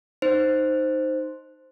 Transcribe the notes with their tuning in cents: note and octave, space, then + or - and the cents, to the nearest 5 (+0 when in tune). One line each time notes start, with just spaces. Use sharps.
D#4 -5 C5 +0